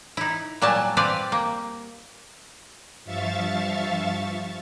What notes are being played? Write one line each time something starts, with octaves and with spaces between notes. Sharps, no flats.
D#4 E4
A#2 F#3 G3 G#5 A5
C4 G4 B4 D5 F5
A#3
G2 F3 E5 F5 C#6 A6